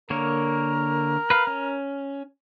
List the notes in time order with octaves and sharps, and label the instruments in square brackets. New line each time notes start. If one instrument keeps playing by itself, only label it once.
[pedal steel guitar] D3 A#3 C#5 [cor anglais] A#4
[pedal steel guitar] B4 F5
C#4